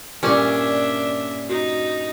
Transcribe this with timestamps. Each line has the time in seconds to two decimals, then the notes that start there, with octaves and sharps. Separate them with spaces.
0.23 G2 A#2 C#4 D4 D5 E5
1.50 D#4 F#4